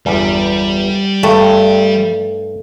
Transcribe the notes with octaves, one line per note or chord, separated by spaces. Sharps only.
G1 E2 G3
G2 A3 G5